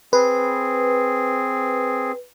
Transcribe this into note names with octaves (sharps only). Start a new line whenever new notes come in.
C4 G#4 B4